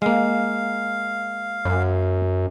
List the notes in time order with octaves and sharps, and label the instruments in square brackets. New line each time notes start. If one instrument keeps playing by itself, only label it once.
[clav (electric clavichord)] G#3 A#3 [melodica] F5
[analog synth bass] F#2